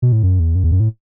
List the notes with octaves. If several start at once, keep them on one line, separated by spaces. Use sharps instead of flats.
B2
A2
F#2
E2
F#2
E2
F#2
A2